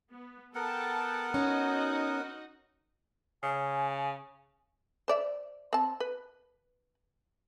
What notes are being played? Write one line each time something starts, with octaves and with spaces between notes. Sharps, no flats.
B3
B3 A4 A#4 F#5 G5 A5
C#4 D#4 F#4 D#5
C#3 G#5
C5 D5 E5
C4 A5
B4